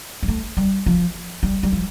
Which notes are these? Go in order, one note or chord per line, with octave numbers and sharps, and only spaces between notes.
G3
A3
G3
F3
G3
G3
F3